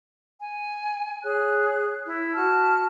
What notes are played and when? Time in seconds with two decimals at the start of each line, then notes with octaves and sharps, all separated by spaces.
0.41 G#5
1.23 G#4 C#5 F#6
2.06 E4
2.35 F#4 A5 F6